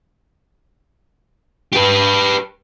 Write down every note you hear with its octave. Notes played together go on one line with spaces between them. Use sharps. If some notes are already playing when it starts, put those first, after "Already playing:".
G4 B4